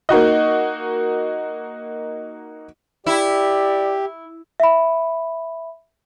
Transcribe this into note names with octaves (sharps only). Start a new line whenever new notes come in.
A#3 D#4 F#4 D#5
E4 G4 D5
E5 B5